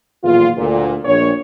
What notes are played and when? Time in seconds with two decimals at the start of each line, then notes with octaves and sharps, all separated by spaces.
0.24 B1 E2 A#2 D#3 F4
0.58 D2 A#2
1.05 A#1 C#5